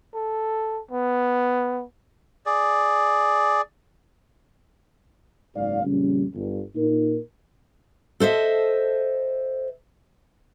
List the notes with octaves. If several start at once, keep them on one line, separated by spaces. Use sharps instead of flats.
A4
B3
G#4 D5
F#1 G#2 D5 F5
F2 A#2 C#3 G3 C#4
G1
A#2 D#4 A#4
A4 C5 D#5 E5